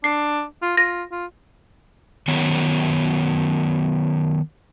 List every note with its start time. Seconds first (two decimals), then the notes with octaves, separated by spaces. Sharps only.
0.04 D4 C7
0.62 F4
0.77 F4 A#6
1.11 F4
2.28 D#3 F#3 B3 C#5